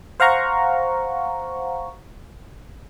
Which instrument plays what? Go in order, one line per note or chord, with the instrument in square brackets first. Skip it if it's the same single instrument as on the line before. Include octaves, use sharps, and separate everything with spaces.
[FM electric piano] C5 F5 F#5 A#5 C#6